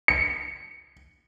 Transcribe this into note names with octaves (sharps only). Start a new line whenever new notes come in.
C#7